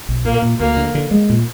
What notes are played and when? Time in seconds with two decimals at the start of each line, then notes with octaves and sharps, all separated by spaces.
0.09 B1
0.25 A#2 A#3
0.42 A#2
0.60 D2 A#3
0.77 D3
0.95 D3
1.11 G#3
1.30 A#2